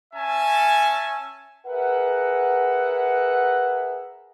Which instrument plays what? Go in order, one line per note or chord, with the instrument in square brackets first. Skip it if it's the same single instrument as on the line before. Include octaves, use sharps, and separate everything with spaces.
[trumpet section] C#4 E5 G#5 A5
[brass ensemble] G#4 A#4 B4 E5 F#5